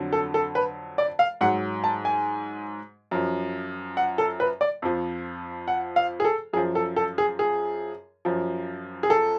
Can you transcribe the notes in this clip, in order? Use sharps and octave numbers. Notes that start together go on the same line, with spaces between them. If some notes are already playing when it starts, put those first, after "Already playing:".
Already playing: F2 D3 F#3
A4
A4
B4
D5
F5
G#2 F#3 F#5
A5
G#5
F#2 F3
F#5
A4
B4
D5
F2 F3
F#5
F5
G#4
A4
F#2 F3 G#4
A4
A4
G#4
G#4
F#2 F3
G#4
A4